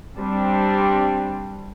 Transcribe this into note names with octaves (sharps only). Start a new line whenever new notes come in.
G3 C4 D4